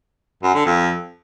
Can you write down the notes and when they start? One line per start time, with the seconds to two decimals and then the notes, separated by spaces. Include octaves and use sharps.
0.43 F#2
0.54 D3
0.66 F2